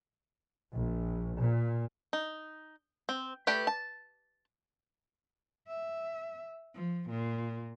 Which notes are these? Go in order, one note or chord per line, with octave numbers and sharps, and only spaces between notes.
A#1
A#2
D#4
C4
A3 G4 B4 D5 G5
A5
E5
F3
A#2